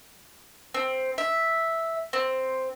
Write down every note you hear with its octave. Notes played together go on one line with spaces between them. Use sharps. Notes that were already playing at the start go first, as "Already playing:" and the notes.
C4
E5
C4